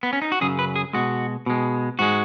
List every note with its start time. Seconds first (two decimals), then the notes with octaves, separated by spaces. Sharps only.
0.03 B3
0.13 C#4
0.22 D#4
0.32 F#4
0.41 F#2 C#3 F#3 G#4
0.59 B4
0.76 G#4
0.93 B2 G#3 F#4
1.46 B2 G#3
1.99 G#2 G#3 F#4